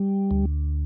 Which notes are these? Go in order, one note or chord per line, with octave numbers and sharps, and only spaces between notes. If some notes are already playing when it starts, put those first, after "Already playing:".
Already playing: G3
D2